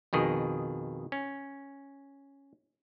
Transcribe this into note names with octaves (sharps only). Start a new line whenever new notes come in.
F2 B2 D#3 G#4
C#4